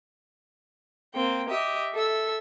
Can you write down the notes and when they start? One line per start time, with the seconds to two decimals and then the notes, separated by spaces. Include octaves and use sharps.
1.13 A#3 C4 G5
1.49 G4 D#5 E5
1.94 A4 E5 E6